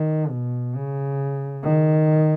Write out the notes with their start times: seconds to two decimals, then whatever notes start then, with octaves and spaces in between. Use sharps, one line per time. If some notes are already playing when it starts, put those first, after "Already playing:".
Already playing: D#3
0.30 B2
0.75 C#3
1.63 D#3